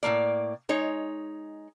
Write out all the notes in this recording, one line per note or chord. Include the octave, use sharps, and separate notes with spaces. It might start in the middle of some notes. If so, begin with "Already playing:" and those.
A2 F#3 A#3 D5
G#3 D#4 C#5